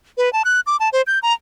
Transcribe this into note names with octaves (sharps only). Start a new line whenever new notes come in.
B4
A5
F#6
D6
A5
C5
G6
A#5